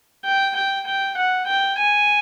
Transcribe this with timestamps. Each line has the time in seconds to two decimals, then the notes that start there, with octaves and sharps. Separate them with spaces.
0.25 G5
0.56 G5
0.87 G5
1.17 F#5
1.47 G5
1.78 G#5